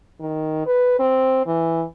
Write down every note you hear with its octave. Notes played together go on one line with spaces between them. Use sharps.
D#3
B4
C4
E3